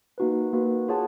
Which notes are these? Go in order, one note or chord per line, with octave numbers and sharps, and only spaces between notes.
A#3 D#4 F#4 B4
A#3 D#4 F#4 B4
F4 G#4 C#5 F#5 A5